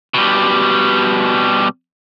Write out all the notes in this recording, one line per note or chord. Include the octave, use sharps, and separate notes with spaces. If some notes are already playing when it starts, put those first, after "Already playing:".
B2 G3